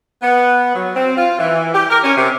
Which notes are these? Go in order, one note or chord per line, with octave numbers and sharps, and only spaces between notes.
B3
F#3
C4
F4
E3
G4
A#4
C#4
C3